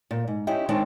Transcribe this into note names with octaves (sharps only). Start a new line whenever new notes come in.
A#2
G#2
C#4 D#4 E4 G4
D#3 G#3 C4 D4 C#5